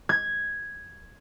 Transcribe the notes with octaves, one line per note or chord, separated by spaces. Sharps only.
G#6